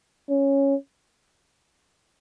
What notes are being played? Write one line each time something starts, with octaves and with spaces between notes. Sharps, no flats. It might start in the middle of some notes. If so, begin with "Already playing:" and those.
C#4